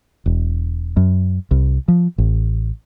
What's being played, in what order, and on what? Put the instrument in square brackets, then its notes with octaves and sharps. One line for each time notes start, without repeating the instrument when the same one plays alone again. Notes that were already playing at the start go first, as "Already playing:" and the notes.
[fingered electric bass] E1
F#2
C2
F3
A1